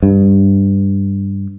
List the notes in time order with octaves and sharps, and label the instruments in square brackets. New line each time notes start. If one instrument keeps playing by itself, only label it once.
[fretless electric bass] G2